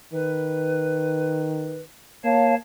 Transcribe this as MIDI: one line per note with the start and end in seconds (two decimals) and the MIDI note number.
0.13 1.84 51
0.13 1.81 71
2.24 2.55 58
2.24 2.54 73
2.24 2.54 77
2.24 2.54 81